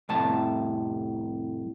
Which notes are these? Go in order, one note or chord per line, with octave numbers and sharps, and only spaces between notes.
C2 F2 A2 A5